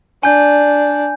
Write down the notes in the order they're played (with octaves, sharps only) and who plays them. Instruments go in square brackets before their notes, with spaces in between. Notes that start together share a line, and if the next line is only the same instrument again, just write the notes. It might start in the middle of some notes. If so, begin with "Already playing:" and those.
[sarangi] D4 [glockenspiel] G#5 G6